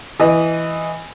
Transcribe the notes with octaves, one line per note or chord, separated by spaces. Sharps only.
E3 D#5